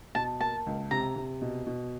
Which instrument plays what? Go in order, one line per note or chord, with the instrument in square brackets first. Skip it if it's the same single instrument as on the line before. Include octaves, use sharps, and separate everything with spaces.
[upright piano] B2 [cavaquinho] A5
[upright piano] A#3 [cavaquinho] A5
[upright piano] C#2
[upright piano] C3 [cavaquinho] A#5
[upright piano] C3
B2
B2